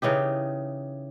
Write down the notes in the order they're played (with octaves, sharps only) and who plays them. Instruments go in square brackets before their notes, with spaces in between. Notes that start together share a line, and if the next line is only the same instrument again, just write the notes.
[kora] C#3 E3 D#4 G4